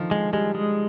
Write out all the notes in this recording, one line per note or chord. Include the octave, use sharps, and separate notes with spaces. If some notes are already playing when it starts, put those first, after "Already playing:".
Already playing: D3 D#3 F3
G#3
G3 G#3
G#3